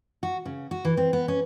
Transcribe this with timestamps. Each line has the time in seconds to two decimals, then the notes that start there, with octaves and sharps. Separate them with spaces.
0.23 F#4
0.45 C#3
0.71 F#4
0.85 E3
0.97 C4
1.13 B3
1.28 C#4